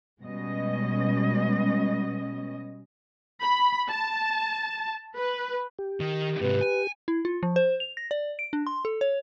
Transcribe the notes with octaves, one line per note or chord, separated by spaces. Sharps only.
B2 G3 G#3 C#4 D#5
B5
A5
B4
G4
D#3
G#2 C3 B4
G#5
E4
F4
F3
C5
F7
A#6
D5
D7
D4
C6
A4
C#5